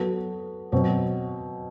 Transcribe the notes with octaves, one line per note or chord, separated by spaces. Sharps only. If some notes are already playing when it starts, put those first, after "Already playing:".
Already playing: F#3 B3 F#4 A4
B2 F#3 C4